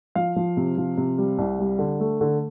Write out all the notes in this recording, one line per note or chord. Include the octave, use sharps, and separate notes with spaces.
F3 F5
F3
C3
F3
C3
G3
C2
G3
D3
A3
D3